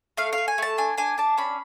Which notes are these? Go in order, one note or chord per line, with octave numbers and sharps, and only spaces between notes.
A3 F5
F5
A3
G#5
A3 A5
D4 G#5
D4 G#5
D4 A5
C#4 B5